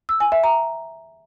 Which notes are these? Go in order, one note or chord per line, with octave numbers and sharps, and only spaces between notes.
E6
G#5
E5
A#5